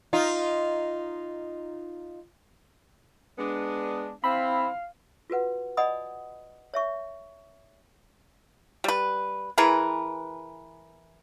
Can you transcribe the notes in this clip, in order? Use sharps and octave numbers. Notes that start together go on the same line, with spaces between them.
D#4 F4
G#3 B3 D4
C4 E4 C5 F5 B5
F4 F#4 B4 F#5
D5 D#5 F#5 G#5 B5 D#6
C#5 E5 C#6
G3 B4
E3 G#4 A#4 B4